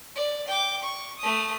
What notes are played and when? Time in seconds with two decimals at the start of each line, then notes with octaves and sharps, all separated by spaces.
0.16 D5
0.48 G5 D6
0.83 C#6
1.19 A3 D#6